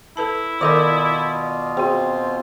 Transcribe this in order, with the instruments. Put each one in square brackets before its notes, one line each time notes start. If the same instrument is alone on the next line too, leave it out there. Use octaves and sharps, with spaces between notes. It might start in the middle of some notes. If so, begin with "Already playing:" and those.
[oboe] E4 [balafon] A4 B4 A5
[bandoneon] B2 F4 [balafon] D#3 A4 A#4 [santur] D5 D#5
[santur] C4 [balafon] F#4 G#4